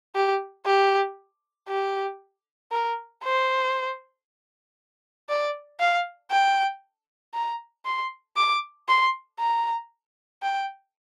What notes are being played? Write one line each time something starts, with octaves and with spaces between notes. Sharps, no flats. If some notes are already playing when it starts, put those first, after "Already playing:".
G4
G4
G4
A#4
C5
D5
F5
G5
A#5
C6
D6
C6
A#5
G5